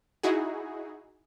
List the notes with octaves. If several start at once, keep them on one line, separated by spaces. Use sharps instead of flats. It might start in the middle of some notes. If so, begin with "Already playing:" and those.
D#4 E4 F#4 G#4